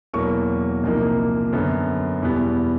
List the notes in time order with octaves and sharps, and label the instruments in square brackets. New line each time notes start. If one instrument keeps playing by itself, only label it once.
[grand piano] E2 B2 F#3 A#3 C#6
C2 A#2 F3 A#3 D#4
F#2 D3 F#3 B3
E2 B2 G3 B3